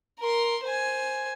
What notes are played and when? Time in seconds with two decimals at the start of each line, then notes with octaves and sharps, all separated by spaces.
0.19 A#4 C6
0.64 C5 G#5